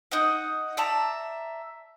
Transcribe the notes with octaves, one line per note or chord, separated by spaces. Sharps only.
D#4 D#5 F#5
D5 E5 A5 A#5